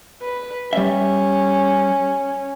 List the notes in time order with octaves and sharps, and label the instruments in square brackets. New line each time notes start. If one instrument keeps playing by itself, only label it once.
[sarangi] B4
[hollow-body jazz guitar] G3 E5 [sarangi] C#4